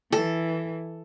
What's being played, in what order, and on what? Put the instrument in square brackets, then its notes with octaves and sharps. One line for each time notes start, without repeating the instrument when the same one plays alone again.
[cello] E3 [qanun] A4